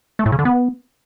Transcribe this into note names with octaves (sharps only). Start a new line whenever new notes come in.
A3
A2
C#3
D3
B3